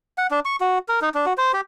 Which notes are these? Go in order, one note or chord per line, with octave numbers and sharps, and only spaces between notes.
F#5
D4
C#6
F#4
A#4
D#4
D4
F#4
C5
G4